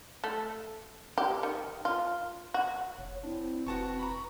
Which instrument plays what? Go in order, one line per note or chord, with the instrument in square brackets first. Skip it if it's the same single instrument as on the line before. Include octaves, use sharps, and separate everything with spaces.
[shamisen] A3
G4
D#3
F4
F#4
[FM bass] F1 [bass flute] C#5
[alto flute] C4 [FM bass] D4 [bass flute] E4
[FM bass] F1 [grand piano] F#4 A5 C#6 [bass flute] B4
[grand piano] A#5 B5 [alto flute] C#6